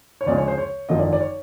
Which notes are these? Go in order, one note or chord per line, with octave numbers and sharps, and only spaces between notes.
C#5
D2 C#3 F3 G#3 C#4 D5
C#5
C5
C#5
G#1 F#2 D3 F3 D#5
D5
D5
C#5